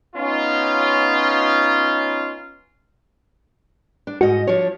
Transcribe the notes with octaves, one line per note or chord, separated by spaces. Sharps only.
B3 C#4 D#4 F4
D4
G#2 F#4 D#5
F3 D4 C#5